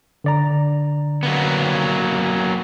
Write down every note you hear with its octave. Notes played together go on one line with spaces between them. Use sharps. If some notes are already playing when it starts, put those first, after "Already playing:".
D3 D5 A#5
F#3 A#3 B3